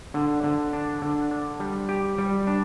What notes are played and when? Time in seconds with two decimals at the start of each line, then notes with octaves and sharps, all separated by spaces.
0.14 D3
0.44 D3
0.73 D4
1.02 D3
1.31 D4
1.60 G3
1.89 G4
2.18 G3
2.47 D4